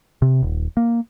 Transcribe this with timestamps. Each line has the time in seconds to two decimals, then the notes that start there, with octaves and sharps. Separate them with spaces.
0.22 C3
0.42 D#1
0.77 A#3